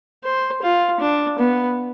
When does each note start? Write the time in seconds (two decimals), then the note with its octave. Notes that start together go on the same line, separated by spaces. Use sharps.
0.24 C5
0.62 F4
1.00 D4
1.39 B3